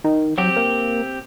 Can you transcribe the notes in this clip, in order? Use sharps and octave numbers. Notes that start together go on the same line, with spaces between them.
D#3
F#3 C4 G4
A#3